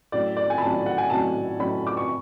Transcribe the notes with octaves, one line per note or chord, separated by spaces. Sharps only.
A2 F#3 C#4 D5
D5
G#5
B5
A2 F#3 C#4 A5
F#5
G#5
A2 F#3 C#4 A5
A2 F#3 C#4 B5
D6
C#6